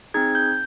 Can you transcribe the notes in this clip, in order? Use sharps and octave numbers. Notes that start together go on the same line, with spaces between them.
C4 D#4 G#4 G#6
G6